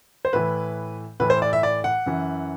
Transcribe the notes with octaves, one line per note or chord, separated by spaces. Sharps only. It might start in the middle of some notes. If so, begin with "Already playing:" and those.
C5
A2 E3 B4
A2 E3 B4
C5
D5
E5
D5
F#5
F#2 E3